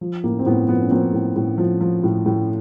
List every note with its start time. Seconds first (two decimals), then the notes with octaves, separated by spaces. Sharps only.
0.01 F3
0.24 A2 A#3
0.39 C4
0.46 A2 B3
0.68 F3 B3
0.81 C#4
0.91 F3 A#3 C4
1.13 A2
1.36 A2
1.58 F3
1.81 F3
2.04 A2
2.26 A2